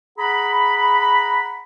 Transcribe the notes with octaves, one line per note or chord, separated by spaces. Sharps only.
G#4 F#5 A#5 B5